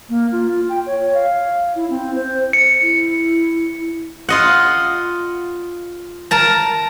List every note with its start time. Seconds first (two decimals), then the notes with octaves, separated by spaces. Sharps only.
0.09 A#3
0.32 F4
0.69 G5
0.86 C#5
1.14 F5
1.76 E4
1.90 C4
2.15 C5
2.53 C#7
2.82 E4
4.29 F4 D#5 F#5
6.31 A#4 A5 A#5